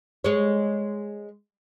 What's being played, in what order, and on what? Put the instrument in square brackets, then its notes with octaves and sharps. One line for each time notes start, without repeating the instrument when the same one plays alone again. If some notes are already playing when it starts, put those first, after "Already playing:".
[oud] G#3 C#5